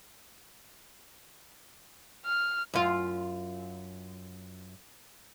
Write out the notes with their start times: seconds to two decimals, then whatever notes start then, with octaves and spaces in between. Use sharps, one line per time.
2.26 F6
2.74 F#2 F4